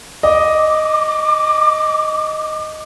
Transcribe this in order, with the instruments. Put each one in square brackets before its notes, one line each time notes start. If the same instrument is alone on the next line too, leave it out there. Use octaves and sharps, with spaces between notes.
[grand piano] D#5 [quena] D6